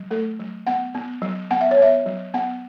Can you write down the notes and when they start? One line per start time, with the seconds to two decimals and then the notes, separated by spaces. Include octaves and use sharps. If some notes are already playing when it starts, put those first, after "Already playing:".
Already playing: F#3
0.11 A3 A4
0.39 F#3
0.67 B3 F#5
0.94 B3
1.22 F#3
1.51 B3 F#5
1.61 E5
1.71 C#5
1.78 B3 E5
2.06 F#3
2.34 B3 F#5